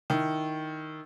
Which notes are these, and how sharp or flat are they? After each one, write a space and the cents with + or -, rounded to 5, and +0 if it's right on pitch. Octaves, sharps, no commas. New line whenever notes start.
D#3 +0 E4 +0